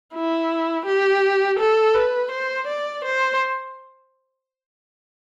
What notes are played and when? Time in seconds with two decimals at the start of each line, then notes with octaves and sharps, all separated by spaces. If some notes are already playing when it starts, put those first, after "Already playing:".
0.15 E4
0.86 G4
1.59 A4
1.95 B4
2.31 C5
2.67 D5
3.04 C5